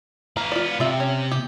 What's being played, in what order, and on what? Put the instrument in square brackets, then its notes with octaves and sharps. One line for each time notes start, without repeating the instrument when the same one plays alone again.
[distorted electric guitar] B3 F5 [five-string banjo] A#5
[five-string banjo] F4 D5
[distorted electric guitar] C3 [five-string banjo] F4 D5 E5
[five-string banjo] C#4
G4